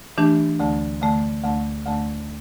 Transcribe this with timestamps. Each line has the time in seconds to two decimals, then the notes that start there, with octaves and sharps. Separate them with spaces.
0.18 E3 A3 D4 G4
0.60 D2 D3 A3
1.02 D2 D3 A3
1.44 D2 D3 A3
1.86 D2 D3 A3